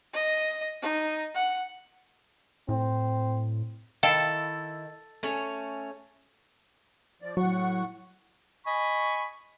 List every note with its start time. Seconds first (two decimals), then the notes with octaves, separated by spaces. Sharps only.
0.13 D#5
0.82 D#4
1.35 F#5
2.69 A2 C4
4.03 D#3 E4 A4 F5 G5 E7
5.23 A3 C#4
7.22 F3 D5
7.37 A2 F#3 F#5 C#6
8.66 D#5 G#5 B5 C#6